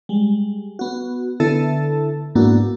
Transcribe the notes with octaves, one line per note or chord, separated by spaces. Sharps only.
G3 G#3
B3 F#4
D3 B3 E4 A4 E5 A5
G#2 A#3 B3 D4 E4 F#4